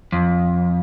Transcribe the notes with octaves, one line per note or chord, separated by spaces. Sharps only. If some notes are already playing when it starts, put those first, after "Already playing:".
F2